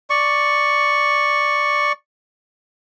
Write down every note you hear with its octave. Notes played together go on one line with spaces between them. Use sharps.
D5 C#6